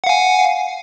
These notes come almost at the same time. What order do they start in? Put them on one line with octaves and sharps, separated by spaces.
F#5 F5 G#5